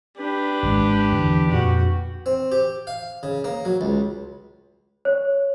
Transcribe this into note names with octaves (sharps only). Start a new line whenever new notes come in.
D4 G4 B4
G#1 G#3
E2 D3
F2 A#2 F#4
C4
G4
F5
C#3
A#3
F#3
C#2
C#5